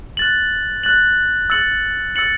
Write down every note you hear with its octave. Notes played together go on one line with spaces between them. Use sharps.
F#6 A6 F#7
F#6 A6 F#7
E6 A6 C#7 F#7
E6 A6 C#7 F#7